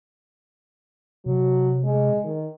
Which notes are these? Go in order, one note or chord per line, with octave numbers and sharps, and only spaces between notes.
C3 F#3
G#3
D#3